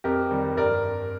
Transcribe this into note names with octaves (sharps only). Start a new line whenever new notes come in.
F2 G4 A#4
D#3 G3
G2 A#4 D5